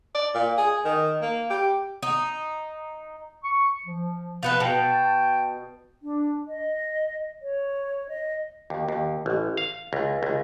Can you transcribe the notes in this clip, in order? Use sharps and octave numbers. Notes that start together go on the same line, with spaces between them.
D5
A#2
G#4
D#3
A#3
G4
D#4
C#6
F3
F3 B3 B4
B2 G5 A5
D4
D#5
C#5
D#5
D#2
D#2
A1
F5
C#2
C#2